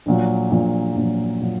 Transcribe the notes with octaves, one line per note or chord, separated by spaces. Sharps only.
A#1 A#2 F#3
A#1 A#2 F#3
A#1 A#2 F#3
A#2 F#3